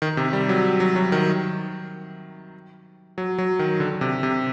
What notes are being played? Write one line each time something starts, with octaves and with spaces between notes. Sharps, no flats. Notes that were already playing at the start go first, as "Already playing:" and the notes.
D#3
C3
G3
F#3
F#3
F#3
D#3
F#3
F#3
D#3
D3
C3
C3